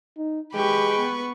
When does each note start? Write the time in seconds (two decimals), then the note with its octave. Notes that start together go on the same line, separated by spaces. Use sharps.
0.17 D#4
0.55 G#3 G4 B4 G5 C#6
0.99 B3